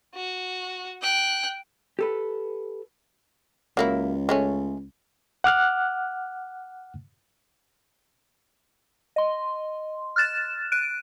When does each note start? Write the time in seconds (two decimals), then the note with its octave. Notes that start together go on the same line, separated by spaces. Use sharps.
0.15 F#4
1.02 G5 F#6
1.99 G4 A4 B4
3.77 C#2 F#3 A#3 E4
4.29 G#3 A3 C#4
5.44 F#5 D6 F6 F#6
9.16 D#5 C6
10.16 F6 F#6 A6 E7
10.72 F#6 D7 D#7